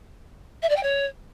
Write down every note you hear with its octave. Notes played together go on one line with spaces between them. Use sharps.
E5
D5
G5
C#5